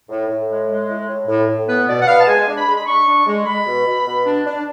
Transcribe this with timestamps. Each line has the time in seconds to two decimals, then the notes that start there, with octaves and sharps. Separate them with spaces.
0.09 A2
0.29 A2
0.49 G#3
0.68 G#3
0.88 A2
1.08 A2
1.27 A2
1.47 A2
1.67 B3 B4
1.87 B2 D5
2.00 F#5
2.07 B3 F5
2.19 A5
2.27 G#3 G#5
2.47 D4
2.57 B5
2.67 G#3
2.75 B5
2.86 D4 C#6
3.07 D4
3.27 G#3
3.46 G#3 B5
3.66 B2
3.86 B2
4.06 B2
4.25 D4
4.45 D4